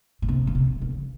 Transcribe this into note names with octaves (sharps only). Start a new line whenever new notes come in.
A#2
C3
C#3
C3
C#3